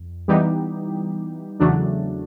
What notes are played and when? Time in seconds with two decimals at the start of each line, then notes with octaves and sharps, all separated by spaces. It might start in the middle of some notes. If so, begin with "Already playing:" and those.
Already playing: F2
0.28 E3 G3 B3 D#4 G4
1.60 E2 C#3 F#3 A3 D4